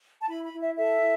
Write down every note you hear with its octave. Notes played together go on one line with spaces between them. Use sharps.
A5
E4 B5
B5
E4
E5
A4 E5
E4